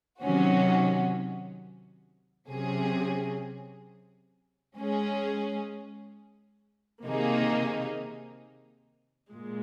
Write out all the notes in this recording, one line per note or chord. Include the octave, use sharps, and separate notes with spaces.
C3 D#3 F#3 C#4 F#4
C3 F#3 C#4 G#4
G#3 C#4 G#4
C3 D#3 A#3 D#4 G#4
A#2 G#3